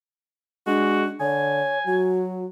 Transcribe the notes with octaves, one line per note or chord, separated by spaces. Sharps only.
G#3 D4 F#4
D3 C#5 G#5
F#3 F#4